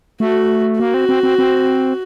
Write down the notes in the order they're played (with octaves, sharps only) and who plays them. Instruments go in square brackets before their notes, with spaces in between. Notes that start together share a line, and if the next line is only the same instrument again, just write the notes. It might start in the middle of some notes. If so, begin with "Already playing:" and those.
[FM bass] A3 [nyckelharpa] F#4
[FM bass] A#3 [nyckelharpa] F#4
[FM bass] C4
C4
C4
C4